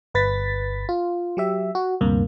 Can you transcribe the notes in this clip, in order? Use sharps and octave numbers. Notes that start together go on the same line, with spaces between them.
G1 B4 A6 B6
F4
F#3 G4 E5
F#4
D2 G2 C3 A#3